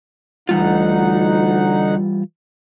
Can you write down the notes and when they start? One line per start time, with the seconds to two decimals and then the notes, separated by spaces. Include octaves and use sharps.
0.49 D2 E3 G3 D#4 F4 F#5